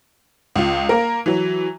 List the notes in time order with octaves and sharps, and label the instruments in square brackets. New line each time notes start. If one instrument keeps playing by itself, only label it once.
[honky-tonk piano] C#2 F4
A#3 A#4
E3 F#3